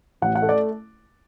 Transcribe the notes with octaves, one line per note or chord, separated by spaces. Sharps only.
A1 F#5
F#5
A3
D5